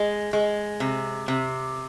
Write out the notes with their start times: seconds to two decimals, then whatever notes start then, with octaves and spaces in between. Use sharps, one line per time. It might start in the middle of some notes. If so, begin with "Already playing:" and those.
Already playing: G#3
0.33 G#3
0.80 C3
1.28 C3